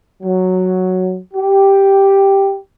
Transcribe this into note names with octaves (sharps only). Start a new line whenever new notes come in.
F#3
G4